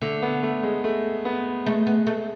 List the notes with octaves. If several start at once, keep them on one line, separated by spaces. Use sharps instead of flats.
D3 A3
B3
A3
G#3
A3
B3
G#3 A3
B3
A3